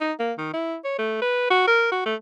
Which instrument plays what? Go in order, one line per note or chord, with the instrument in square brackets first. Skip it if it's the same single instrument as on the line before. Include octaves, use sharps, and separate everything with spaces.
[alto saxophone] D#4
A#3
D#3
E4
C#5
A3
B4
F#4
A#4
F#4
A3